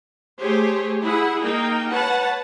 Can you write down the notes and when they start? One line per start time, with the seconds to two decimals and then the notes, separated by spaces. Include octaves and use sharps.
0.40 A3 G4 G#4 C5 C#5
1.01 E4 G#4 F#5
1.41 A#3 D#4 G5
1.90 B4 C#5 F#5 A5